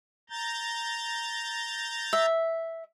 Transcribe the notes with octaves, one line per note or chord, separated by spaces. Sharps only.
A#5 G6 A6
E5